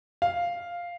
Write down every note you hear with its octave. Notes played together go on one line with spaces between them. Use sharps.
F5